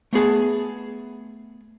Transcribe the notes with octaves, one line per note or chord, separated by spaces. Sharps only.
A3 B3 G#4 A5